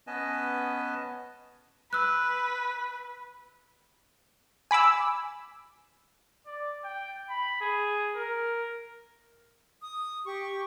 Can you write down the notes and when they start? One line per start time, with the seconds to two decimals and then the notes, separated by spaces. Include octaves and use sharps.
0.07 B3 C#4 B4 D#5 G#5 A5
1.93 B4 E6 F#6
4.71 G#5 B5 D6 E6
6.46 D5
6.84 G5
7.29 B5
7.61 G#4
8.16 A#4
9.82 D#6
10.24 G4 C#6